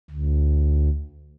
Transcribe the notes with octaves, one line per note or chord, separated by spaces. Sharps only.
D2